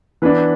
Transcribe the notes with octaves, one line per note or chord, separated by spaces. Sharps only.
E3 B3 D4 B4